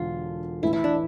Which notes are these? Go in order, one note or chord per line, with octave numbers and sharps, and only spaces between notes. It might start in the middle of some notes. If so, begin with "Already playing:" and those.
Already playing: E1 D3 F4
A1 A2 E3 E4
E4
D4